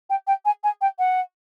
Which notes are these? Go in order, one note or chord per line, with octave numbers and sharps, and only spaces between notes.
G5
G5
G#5
G#5
G5
F#5